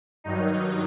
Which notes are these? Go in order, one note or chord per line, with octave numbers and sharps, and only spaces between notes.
G2 D#3 F#3 D#4